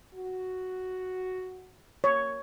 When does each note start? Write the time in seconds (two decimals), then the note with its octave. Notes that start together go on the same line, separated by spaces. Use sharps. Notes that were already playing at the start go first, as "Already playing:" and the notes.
0.13 F#4
2.04 A#3 C#5